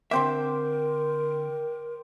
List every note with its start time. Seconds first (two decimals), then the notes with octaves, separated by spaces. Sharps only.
0.11 D3 C4 A#4 C5 E5 G5 D6